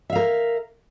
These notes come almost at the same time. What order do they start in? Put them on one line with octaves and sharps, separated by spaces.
E5 F5 A#4